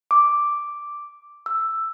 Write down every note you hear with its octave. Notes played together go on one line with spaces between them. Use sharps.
D6
E6